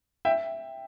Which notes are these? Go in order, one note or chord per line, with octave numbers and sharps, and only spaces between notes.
E5 G5